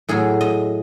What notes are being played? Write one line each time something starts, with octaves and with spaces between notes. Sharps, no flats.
A2 F#3 G#4
D#5